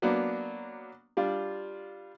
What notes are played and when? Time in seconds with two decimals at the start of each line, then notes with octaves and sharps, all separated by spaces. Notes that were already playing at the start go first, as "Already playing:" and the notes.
0.02 F#3 A#3 B3 D4
1.17 G3 D4 F4